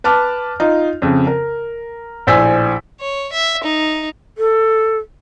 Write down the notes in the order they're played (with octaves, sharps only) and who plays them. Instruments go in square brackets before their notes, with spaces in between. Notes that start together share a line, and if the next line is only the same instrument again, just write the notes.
[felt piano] B4 A5 D6 F6
D#4 F4
F2 C#3
A#4
A#1 A2 C5 G#5 E6 B6
[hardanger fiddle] C#5
E5
D#4
[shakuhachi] A4